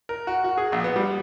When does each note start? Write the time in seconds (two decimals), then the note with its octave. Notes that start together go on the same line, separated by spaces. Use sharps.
0.09 A#4
0.27 F#4
0.44 F#4
0.57 G#4
0.72 A#1
0.84 B3
0.96 G3